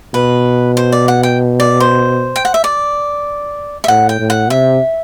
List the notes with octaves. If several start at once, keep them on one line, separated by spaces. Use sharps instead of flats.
B2 B4
C5
D5
F#5
G5
D5
C5
G5
F#5
E5
D5
E5
A2 F#5
G5
A2
F#5
C3 E5